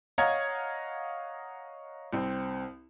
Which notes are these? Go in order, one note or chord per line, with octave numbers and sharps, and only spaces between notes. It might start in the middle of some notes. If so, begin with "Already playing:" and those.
C#5 D#5 F5 F#5 A#5 G#6
C2 C4